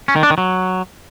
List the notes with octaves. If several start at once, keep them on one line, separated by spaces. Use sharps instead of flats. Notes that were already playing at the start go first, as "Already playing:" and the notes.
C#4
D#3
D4
D#3
F#3